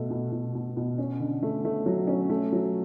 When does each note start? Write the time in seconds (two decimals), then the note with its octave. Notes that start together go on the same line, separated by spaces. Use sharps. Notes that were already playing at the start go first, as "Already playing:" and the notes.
Already playing: B2 A3
0.10 B2
0.32 B2
0.55 B2
0.77 B2
0.98 C#4
1.20 D3
1.43 A3
1.65 A3
1.86 F#3
2.07 C#4
2.29 A3
2.52 F#3